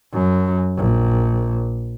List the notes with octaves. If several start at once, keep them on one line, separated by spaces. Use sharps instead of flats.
F#2
A#1